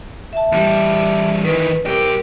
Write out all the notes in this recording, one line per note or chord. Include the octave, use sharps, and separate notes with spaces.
E5 A5
E2 G3
D#3 E3 B4
C2 G4 A#4